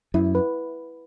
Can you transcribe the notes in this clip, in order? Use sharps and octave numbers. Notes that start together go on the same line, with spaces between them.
F#2 E4
B4